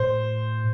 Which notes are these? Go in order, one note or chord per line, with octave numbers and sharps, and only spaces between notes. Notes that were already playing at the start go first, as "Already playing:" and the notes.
Already playing: A2 C5